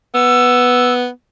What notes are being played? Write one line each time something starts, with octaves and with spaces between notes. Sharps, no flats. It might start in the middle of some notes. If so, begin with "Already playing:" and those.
B3 E6